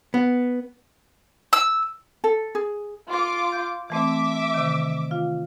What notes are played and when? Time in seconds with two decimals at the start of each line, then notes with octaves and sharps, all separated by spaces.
0.14 B3
1.53 E6
2.24 A4
2.55 G#4
3.09 F4 D6
3.52 G6
3.90 E3 A3 C4 E5 D6
4.54 C3 D#3
5.11 F4 F5